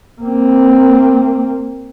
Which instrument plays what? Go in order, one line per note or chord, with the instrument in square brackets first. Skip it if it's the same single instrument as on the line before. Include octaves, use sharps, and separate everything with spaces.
[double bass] A#3 C4